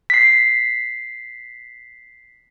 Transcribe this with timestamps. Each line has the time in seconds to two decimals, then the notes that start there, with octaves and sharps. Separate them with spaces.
0.10 B6 C7